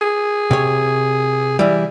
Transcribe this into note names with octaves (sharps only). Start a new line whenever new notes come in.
G#4
C3 C#5
E3 G3 E4